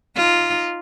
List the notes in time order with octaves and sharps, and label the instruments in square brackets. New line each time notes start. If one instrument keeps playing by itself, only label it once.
[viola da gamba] D#4 F4